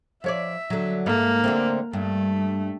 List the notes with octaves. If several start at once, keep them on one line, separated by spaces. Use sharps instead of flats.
F3 C#5 D5 E5
D3 F#3
G#2 A3 A#3
D3 A3 C4
G2 A3